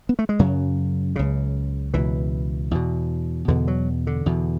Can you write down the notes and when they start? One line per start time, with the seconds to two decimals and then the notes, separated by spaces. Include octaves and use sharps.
0.09 B3
0.19 A3
0.29 G#3
0.39 F#2 C#3 F#3
1.16 C#2 C#3
1.94 C#2 B2 E3
2.71 E2 B2
3.48 E2 B2 D3
3.68 F#3
4.07 D3
4.26 E2 B2